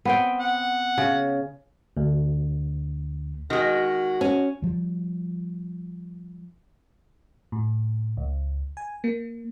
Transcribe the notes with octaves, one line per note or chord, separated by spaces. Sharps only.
B3 C4 G5
F#5
C#3
D2
D#3 G#3 F#4
C#4
F3 G3
A2
C#2
G#5
A#3